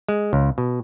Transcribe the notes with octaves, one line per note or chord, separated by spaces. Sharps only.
G#3
C#2
B2